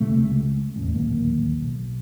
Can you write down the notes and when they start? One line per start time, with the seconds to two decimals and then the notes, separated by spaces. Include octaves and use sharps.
0.01 E1 D2 C3 A3
0.17 C#2
0.76 A1 E2
0.95 D1 A#1 D#2 A#3
1.61 B1